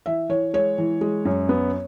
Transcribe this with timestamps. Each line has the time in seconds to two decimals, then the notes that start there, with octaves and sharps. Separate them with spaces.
0.06 E3 E5
0.29 E3 C#5
0.53 G#3 C#5
0.78 E3
1.01 G#3
1.25 F#2
1.49 B3